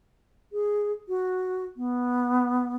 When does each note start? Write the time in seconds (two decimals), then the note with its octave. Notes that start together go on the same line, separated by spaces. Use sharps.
0.52 G#4
1.08 F#4
1.77 B3